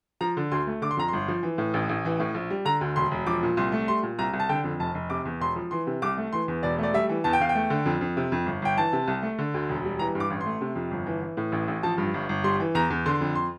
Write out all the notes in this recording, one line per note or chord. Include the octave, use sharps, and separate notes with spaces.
F3 A#5
D3
D2 C6
A3
D3 D6
C6
F2 A#5
G1 C6
F3
E3
A2
A1
A1
E3
A2
A#1
G3
D3 A#5
D2
E1 C6
E1
F3 D6
A#2
C2 C6
A3
G3 C6
A#2
C2 A#5
C2
A5
D3 G5
F2
F1 A5
F1
C3 D6
E2
E1 C6
F3
E3 C6
C3
C2 D6
A3
E3 C6
E2
E1 D5
A3 D5
G3 E5
E3
E2 A5
G5
E2 F5
G5
A3
D3
F2
F2
C3
F2
G1
G1 G5
E3 A5
C3
C2
A3
D3
D2
E1
G3
E3 A#5
G2
D6
A1
C6
A3
C3
F2
G1
E3
E3
A2
A1
A1
F3 A5
G2
G1
G1
G3 C6
E3
E2 A#5
E2
D3 C6
F2
C6